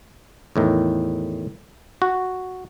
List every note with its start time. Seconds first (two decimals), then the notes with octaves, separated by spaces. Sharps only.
0.56 E2 A2 D#3
2.02 F#4